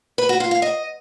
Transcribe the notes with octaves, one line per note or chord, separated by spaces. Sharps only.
B4
F#4
F4
F5
D#5